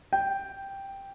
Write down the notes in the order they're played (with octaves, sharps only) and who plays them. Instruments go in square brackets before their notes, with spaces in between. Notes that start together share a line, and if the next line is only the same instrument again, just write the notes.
[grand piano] G5